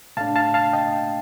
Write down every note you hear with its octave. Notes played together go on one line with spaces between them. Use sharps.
A2 A3 D4 F5 A5
F5 A5
F5 A5
D#5 G5